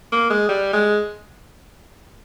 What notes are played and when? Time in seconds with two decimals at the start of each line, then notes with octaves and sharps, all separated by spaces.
0.12 A#3
0.30 G#3
0.48 G3
0.73 G#3